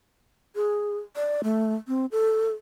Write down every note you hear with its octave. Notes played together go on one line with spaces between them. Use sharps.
G#4
D5
A3
C4
A4